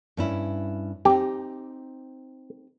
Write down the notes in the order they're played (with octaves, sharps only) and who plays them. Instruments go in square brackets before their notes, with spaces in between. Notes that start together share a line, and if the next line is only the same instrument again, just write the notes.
[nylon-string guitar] G2 C#4 E4
[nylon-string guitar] C4 D#4 [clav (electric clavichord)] G4